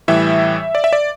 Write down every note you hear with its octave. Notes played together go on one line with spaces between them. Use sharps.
A2 E3 G3 E5
D5
E5
D5